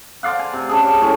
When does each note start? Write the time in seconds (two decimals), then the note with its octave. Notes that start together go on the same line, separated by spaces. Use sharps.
0.23 C5 D5 F5 F#5
0.39 G#5
0.53 C3
0.69 C#4 D4 G#4
0.87 G4
1.01 A2 C#4 C5